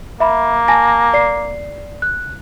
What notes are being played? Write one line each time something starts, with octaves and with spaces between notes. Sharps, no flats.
A#3 E5 B5
G#5 A5 A#6
D5 C7
F#6